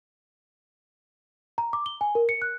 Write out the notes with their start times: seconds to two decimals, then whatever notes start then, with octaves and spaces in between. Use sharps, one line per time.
1.58 A#5
1.73 D6
1.86 G7
2.01 G#5
2.15 A#4
2.29 C#7
2.42 F#6